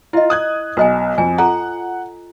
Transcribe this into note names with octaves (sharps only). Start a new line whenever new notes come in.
E4 F4 D#5
D#6 F#6 G#6
B1 C5 D#5 G#5
F2 G#5
F4 A4 F#5 A#5